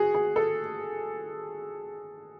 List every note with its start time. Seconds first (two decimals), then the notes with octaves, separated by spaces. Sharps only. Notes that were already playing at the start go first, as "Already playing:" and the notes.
Already playing: F#4 G#4
0.15 G#4
0.36 A4